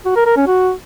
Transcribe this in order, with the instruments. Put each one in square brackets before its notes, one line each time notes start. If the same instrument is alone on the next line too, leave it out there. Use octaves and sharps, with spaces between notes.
[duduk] F#4
A#4
A#4
C#4
F#4